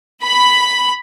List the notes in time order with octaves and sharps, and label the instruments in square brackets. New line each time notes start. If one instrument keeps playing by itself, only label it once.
[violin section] B5